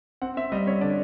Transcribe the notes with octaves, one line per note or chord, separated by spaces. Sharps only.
C4 F#5
C4 E5
G3 D#5
C4 C#5
D3 D5